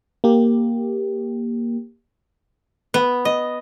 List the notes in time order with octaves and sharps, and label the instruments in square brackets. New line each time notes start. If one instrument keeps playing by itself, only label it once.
[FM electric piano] A#3 G4
[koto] B3
D#5